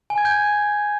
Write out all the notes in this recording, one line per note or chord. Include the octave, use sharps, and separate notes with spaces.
G#5
G#6
G6